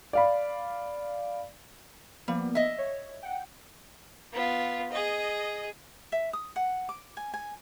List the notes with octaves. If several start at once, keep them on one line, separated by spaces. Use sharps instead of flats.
D5 F5 B5
F3 G3 A#3 B3
D#5 E5
C#5
F#5 G5
B3 F4
G#4 D#5
E5
D#6
F#5
D6
G#5
G#5